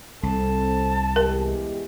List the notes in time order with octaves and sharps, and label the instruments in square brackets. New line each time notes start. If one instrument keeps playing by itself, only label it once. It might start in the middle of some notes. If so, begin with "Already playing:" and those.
[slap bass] C2 [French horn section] C4 A4 [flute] A5
[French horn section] E2 G#3 G4 [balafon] A#4